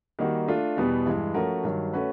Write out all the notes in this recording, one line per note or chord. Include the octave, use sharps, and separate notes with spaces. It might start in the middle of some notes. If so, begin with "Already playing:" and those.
D#3 G3 A#3 D#4 F#4
A3 D4 F4
E2 B2 G3 B3
G2 E3 G#3
F3 A3 C#4 F#4 A#4
G2 D#3 F#3
A3 C#4 F#4 B4